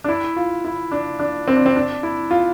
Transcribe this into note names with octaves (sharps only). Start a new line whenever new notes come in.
D4
E4
F4
E4
D4
D4
C4
D4
C4
D4
E4
F4